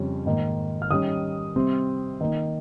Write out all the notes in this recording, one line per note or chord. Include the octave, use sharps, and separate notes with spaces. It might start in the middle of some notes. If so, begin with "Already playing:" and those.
Already playing: F2 C#3 G3 C#4
G#2 D#3 A#3
F6
D#3 G3 C#4 D#6
C3 G3 C4
D#3 A#3 D#4